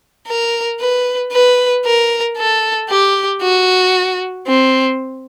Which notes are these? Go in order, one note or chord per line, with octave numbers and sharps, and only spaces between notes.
A#4
B4
B4
A#4
A4
G4
F#4
C4